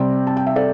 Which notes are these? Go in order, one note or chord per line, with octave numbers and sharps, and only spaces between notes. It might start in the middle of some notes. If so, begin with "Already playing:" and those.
Already playing: C3 G3 C4 D5 G5
A5
G5
E5
A4 D5